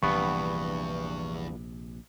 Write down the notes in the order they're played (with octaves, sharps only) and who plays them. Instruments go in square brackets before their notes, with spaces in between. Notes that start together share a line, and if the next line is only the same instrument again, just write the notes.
[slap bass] A#1 C3 [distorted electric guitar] E2 [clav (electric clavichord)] G2 B3 [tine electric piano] C#6